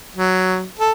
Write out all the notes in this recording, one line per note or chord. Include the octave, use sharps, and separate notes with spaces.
F#3
A4